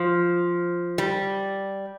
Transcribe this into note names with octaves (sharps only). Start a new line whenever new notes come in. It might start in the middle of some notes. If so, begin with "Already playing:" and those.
Already playing: F3
G3